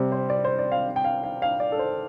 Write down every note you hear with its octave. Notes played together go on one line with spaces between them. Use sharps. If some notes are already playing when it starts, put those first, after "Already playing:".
Already playing: C3 G3 C4
C5
D5
C5
D5
F5
G5
F5
F5
F5
D5
A4
C5